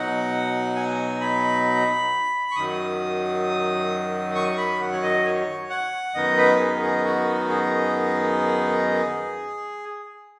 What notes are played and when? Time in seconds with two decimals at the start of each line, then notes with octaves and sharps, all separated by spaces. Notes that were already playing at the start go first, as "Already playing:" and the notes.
Already playing: B2 F#3 D#4 F#5
0.76 G#5
1.21 B5
2.51 C#6
2.55 F#2 D#3 F#3 D#6
4.35 C#6
4.57 B5
4.80 F#5
4.92 C#5
5.03 D#5
5.25 C#5
5.70 F#5
6.15 F#2 D#3 B3 D#4 D#5
6.37 B4
6.59 G#4
6.82 G#4
7.05 F#4
7.49 G#4